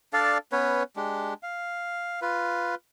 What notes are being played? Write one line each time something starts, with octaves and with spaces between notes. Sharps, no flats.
D4 A4 D5 F5
B3 C#4 B4 C#5
G#3 D4 G4
F5
F4 B4